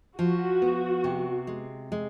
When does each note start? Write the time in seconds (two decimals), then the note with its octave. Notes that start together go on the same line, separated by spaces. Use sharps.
0.18 F3 F#4
0.62 B3
1.04 C3
1.47 G#3
1.92 G#3